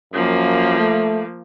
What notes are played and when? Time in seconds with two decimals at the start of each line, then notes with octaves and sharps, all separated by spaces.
0.14 F#2 F3 A#3
0.79 A3